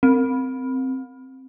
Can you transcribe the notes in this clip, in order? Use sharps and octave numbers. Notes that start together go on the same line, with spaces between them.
C4